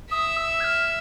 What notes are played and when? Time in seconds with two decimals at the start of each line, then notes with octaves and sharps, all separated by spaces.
0.11 E5 D#6
0.36 E6
0.60 G#6
0.64 F6
0.84 F6